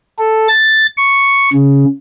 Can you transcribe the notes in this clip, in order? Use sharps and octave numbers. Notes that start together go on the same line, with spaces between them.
A4
A6
C#6
C#3